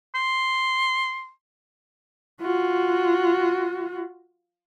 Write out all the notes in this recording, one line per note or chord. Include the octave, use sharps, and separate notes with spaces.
C6
F4 F#4